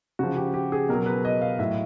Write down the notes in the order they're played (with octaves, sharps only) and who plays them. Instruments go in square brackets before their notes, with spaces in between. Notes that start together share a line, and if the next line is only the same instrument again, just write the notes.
[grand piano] C#3 F3 F#4
G4
G4
G#4
B2 F#3 A#4
B4
D#5
F5
A2 F#3 E5